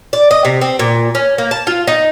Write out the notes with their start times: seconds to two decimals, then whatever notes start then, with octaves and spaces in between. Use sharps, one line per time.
0.13 D5
0.31 D#5
0.45 C3
0.61 C4
0.79 A#2
1.15 C#4
1.38 A#3
1.51 A5
1.67 F4
1.87 D#4